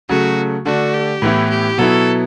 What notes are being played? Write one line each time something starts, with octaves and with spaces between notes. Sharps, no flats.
C#3 F#3 A3 F#4
D3 A3 D4 F#4
G4
A2 E3 B3 E4
G4
B2 F#3 B3 E4 A4